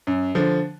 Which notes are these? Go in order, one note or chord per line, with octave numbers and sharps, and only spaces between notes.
F#2
D3 F3